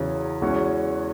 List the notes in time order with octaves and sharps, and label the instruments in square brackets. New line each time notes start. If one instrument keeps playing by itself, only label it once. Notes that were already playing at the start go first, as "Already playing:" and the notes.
Already playing: [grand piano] E2 C#3 F#3 C#4
E2 E3 G#3 C#4 F#4